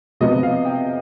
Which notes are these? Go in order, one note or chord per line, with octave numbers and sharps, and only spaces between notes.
C3 F3 B3 D#5
F5
G5